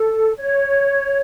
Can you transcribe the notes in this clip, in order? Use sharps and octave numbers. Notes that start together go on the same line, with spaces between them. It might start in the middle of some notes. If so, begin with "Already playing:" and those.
Already playing: A4
C#5